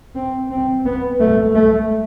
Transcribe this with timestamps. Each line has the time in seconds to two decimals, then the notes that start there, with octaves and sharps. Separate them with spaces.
0.15 C4
0.51 C4
0.85 B3
1.20 A3
1.55 A3